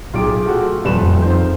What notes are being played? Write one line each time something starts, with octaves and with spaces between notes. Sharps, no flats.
B1 F4 G4 G#4 D7
A3 F#4 G4 A4
D#1 F2 A3 F4 B4 E7
C4 D#4 C5